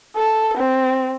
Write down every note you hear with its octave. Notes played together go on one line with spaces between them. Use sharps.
A4
C4